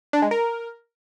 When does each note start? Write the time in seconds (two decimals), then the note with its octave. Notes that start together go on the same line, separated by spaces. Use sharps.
0.13 D4
0.22 G#3
0.31 A#4